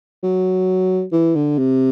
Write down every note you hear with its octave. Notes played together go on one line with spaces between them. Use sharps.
F#3
E3
D3
C3